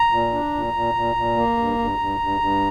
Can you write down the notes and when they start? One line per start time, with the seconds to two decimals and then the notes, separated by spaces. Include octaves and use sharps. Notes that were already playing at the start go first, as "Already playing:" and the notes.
Already playing: A#5
0.12 A#2
0.33 D4
0.53 A#2
0.74 A#2
0.95 A#2
1.16 A#2
1.36 A#3
1.57 G2
1.78 G2
1.98 G2
2.19 G2
2.40 G2